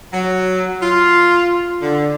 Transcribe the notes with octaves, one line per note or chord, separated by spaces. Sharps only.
F#3
F4
D3